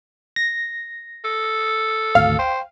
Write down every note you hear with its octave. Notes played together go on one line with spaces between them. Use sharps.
A#6
A4
G#1 D2 F5
C5 G5